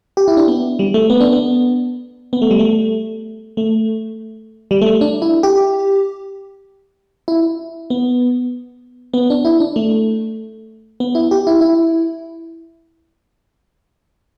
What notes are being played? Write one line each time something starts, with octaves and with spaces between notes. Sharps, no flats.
G4
E4
D4
B3
G3
A3
B3
D4
B3
B3
A3
G3
A3
A3
G3
A3
D4
E4
G4
E4
B3
B3
D4
E4
D4
A3
B3
E4
G4
E4
E4